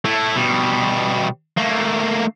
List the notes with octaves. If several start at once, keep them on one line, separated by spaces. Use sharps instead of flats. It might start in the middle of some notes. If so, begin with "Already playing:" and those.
A3 E4
B2 G3
A3 A#3